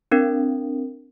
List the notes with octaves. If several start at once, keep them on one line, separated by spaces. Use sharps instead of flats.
C4 D4 A#4